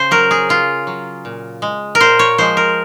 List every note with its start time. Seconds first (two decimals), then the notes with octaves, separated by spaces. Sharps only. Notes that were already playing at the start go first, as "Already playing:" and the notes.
Already playing: C#3 C5
0.11 F#3 A#4
0.31 G#4
0.49 C#3 F4
0.87 F#3
1.25 A#2
1.62 G#3
1.95 A#4
2.00 A#2 C5
2.19 C#5
2.38 F3 G#3 C5
2.57 A#4